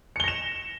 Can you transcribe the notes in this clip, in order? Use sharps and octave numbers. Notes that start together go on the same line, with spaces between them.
A#6 C#7 E7 G7